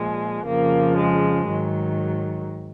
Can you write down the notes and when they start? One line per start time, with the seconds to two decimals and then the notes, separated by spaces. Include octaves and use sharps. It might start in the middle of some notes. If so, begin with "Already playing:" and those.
Already playing: A#2 F3 G#3
0.46 F2 C#3 F3 A#3
0.97 G#3
1.47 G#2 D#3 F#3